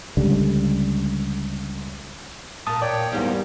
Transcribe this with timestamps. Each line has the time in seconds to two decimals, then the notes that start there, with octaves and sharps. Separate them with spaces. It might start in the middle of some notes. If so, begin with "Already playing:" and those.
0.17 C#2 D3 G3
2.67 A#2 A#3 A5 D#6
2.82 C#5 D5 G5
3.12 E2 G#2 G3 A#3